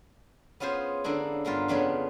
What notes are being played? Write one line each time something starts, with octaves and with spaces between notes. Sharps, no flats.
B3 C#4 F4 G#4 C5
D3 A#3 C#4 D4 E4
G2 A#3 B3 F4
F2 C#3 B3 D4 F4 C#5